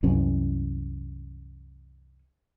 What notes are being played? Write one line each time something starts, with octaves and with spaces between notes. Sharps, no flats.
C2 F#2 E3 C#4